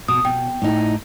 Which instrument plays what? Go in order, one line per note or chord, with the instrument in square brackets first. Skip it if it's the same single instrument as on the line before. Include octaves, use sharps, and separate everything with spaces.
[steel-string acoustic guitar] B2 [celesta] D#6
[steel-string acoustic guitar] B2 [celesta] G5
[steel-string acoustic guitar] A2 D#4